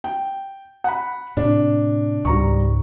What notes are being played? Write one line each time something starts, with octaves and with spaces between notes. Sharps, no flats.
G5
F#5 B5
A2 C3 D4
C#2 G#2 G3 A#5 C#6